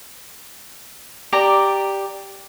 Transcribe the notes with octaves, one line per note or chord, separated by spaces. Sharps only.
G4 D5 A#5